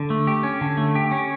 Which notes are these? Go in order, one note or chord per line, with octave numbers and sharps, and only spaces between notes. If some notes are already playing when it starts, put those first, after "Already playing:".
Already playing: D3
A3
G4
C#4
D3
A3
G4
C#4